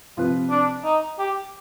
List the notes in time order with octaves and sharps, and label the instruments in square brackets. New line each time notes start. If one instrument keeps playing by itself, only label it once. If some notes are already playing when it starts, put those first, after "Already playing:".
[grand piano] C3 F3 C4 F4 B4
[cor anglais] D4
D#4
G4